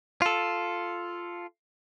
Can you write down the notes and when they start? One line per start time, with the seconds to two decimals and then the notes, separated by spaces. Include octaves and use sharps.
0.22 F4 A4